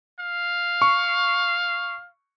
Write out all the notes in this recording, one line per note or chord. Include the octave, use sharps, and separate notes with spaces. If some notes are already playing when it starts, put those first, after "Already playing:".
F5
C#6